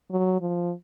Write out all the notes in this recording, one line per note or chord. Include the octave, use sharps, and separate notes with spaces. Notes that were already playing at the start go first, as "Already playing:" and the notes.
F#3
F3